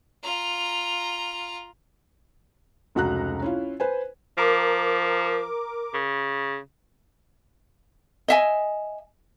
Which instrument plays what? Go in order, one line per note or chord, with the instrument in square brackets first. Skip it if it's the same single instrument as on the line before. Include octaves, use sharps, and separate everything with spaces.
[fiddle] F4 A#5
[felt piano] F1 C#2 F#4 A#5 F#6
C#4 E4 F4
B4 C5 G#5
[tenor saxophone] F3 [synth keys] A#4 D6
[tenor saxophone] C#3
[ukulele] D#5 E5 G#5